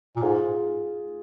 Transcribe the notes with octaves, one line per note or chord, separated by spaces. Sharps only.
A#2
G#2 F4 G#4